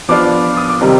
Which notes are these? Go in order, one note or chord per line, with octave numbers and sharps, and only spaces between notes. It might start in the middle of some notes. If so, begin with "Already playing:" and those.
F3 B3 D4 F4 D6
D#6
D6
C3 D#3 G3 C4 D#4